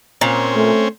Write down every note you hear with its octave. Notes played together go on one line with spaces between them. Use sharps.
A#2 C4 C#4
A3